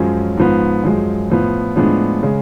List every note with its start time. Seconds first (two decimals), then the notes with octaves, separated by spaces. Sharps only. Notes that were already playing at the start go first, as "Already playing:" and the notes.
Already playing: F#2 F3 G#3 C#4
0.37 G#2 F3 B3
0.84 F#2 F3 G#3
1.30 A2 F3 B3
1.76 A2 F3 G#3 B3 D4
2.23 C#3 G#3